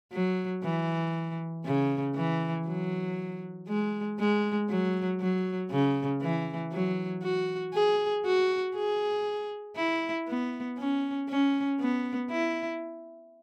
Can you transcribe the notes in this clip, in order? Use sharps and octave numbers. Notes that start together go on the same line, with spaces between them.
F#3
E3
C#3
E3
F#3
G#3
G#3
F#3
F#3
C#3
E3
F#3
F#4
G#4
F#4
G#4
E4
B3
C#4
C#4
B3
E4